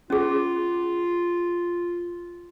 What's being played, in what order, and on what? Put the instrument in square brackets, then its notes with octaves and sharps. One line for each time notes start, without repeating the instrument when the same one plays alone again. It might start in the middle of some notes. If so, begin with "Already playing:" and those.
[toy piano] C#4 G#4 [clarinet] F4